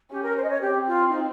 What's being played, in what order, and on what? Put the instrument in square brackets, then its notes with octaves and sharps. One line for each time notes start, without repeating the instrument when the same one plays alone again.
[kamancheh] C#4 [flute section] G4
[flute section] A#4
C5
D#5
C#5
[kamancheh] C4 [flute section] G4
[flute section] F4
D#4